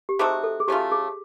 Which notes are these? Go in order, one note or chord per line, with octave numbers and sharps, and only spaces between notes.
G4
A3 C4 D#4 F#4 G#4
A4
G#4
F#3 A3 C#4 F4 G4
G#4